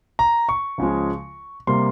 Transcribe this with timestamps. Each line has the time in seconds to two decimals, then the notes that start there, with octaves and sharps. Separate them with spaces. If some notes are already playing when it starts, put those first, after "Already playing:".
0.19 A#5
0.49 C#6
0.78 C#2 C#3 F3 G#3
1.67 C3 G3 A#3 C6